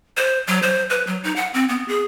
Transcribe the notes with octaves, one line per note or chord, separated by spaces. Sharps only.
C5
F#3
C5
B4
F#3
D#4
F#5
C4
B3
G#4